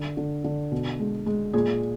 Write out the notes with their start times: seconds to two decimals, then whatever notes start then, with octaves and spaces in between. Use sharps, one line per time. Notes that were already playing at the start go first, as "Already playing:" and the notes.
Already playing: D3
0.17 D3
0.44 D3
0.72 B2
1.00 G#3
1.26 G#3
1.54 A#2 G#4